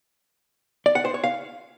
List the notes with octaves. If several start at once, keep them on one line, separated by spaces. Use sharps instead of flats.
D5
F#5
C5
C#5
F5